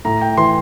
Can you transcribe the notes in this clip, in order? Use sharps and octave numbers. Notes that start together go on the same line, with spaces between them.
A2 A#5
G5
E3 C6